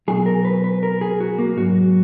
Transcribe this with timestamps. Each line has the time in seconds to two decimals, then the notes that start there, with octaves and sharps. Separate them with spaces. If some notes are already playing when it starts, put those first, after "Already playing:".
0.08 B1 B2 F#3 G#4
0.26 A#4
0.45 B4
0.64 B4
0.83 A#4
1.01 G#4
1.20 F#4
1.39 A#3
1.57 G#2 F#3 F#4